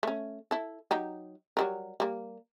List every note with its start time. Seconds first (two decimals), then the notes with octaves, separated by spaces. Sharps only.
0.03 A3 C#4
0.51 E4 A4
0.91 F#3 D#4 G4
1.57 F#3 G3 A#4
2.00 G3 A#3